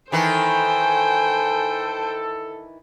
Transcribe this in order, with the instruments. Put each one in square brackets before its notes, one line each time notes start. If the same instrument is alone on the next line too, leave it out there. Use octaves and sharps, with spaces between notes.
[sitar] D#3 E3 E4 [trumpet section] A4 [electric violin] C5 G5 [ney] G#5